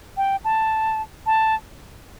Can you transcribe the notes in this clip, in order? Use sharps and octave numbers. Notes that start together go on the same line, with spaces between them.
G5
A5
A5